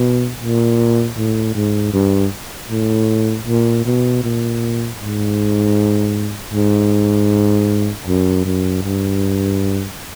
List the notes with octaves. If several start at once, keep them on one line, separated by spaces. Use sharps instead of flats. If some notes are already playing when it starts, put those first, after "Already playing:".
Already playing: B2
A#2
A2
G#2
G2
A2
A#2
B2
A#2
G#2
G#2
F#2
F#2
G2